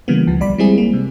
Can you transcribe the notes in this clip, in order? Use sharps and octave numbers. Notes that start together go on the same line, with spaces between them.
C#3 E3 G3 A#3 B3
D2 F3
B1 G3 D5 B5
G3 G#3 C4 E4 G#4
A#3
C3